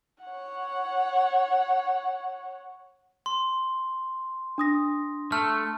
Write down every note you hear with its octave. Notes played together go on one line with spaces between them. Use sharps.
C#5 F#5
C6
D4 D#6 A#6
A3 F6